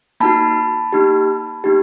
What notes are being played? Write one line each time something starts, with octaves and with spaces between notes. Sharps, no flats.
A#3 D#4 F#4 A5 B5
A#3 D#4 G4
A#3 D#4 G4